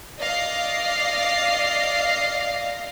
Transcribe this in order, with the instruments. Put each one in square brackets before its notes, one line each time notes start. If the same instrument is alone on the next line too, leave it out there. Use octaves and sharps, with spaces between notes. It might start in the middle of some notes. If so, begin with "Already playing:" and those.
[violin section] D5 D#5 F5 A#6 C7